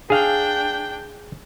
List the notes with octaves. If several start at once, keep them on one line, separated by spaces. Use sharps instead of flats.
D4 G#4 F5 G5